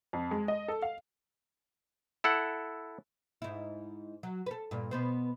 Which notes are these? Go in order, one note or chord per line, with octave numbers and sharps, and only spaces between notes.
F2
G#3
D#5
A4
F5
E4 A4 F#5
G#2 E4
F#3
A4 B4
G2 A#2
B2 B3 C5